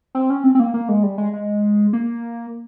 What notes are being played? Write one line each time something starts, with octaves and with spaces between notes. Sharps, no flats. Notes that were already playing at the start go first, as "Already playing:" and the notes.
C4
C#4
C4
C4
A#3
A#3
G#3
G3
G#3
G#3
A#3